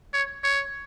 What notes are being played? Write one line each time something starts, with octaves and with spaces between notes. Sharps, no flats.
C#5
C#5